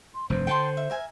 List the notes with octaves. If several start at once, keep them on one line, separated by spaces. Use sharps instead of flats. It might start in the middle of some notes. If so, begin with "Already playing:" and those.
C6
F1 G2 C5
D3 G5 A5 C6
E5
A#4 E5 G#5